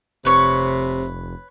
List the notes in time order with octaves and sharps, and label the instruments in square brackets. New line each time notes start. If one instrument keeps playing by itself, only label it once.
[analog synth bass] F1 [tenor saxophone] C3 [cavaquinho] B4 C#5 C#6